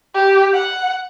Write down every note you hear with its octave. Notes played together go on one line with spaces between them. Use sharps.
G4
F#5